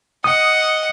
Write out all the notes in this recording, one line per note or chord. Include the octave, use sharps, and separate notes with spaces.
D#5 F#5 D#6